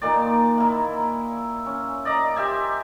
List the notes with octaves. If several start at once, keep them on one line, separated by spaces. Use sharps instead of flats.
A#2 D#3 D5
A#3 E4
C#4
D5 D#5 A#5
G4 C5 E5 G#5